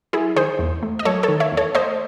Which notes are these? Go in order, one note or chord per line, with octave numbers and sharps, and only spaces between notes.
F#3 E4 G#4
D#3 G#4 C5
E2
A3
D#5
F#3 A4 C#5
A4 C#5
D#3
C#5 E5
E2
A4 C#5
A3 C5 D#5